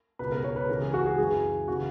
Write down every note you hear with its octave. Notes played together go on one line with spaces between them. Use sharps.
C#2 B2 B4
A#4
C#5
B4
C#2 C#3 E3 A#4
G#4
F#4
G#4
F#2 C#3 E3 G#4
C#3 E3 F#4